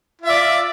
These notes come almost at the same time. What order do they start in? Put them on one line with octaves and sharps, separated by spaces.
F4 E5 D5